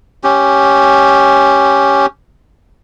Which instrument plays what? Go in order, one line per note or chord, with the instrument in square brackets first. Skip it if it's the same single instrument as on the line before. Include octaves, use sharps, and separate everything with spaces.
[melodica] C#4 G4